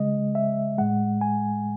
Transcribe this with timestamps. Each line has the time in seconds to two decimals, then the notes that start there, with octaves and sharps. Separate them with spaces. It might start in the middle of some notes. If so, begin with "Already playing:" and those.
Already playing: C#3 G#3 D#5
0.35 E5
0.78 A2 G#3 F#5
1.21 G#5